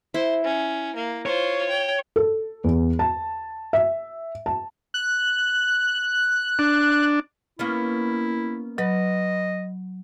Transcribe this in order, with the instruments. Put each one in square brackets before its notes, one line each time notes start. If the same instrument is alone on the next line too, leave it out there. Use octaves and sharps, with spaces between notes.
[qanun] E4 [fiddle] C5
[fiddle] C#4
A#3
[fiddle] F4 C5 [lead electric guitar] C#5
[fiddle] G5
[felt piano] A4
E2
A5
E5
A5
[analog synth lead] F#6
[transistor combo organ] D4
[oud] A#3 B3 C#4 [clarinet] E4
[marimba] F#3 [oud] B4 [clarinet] D#5